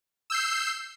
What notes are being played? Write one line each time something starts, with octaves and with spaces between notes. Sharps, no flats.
E6 G6 C7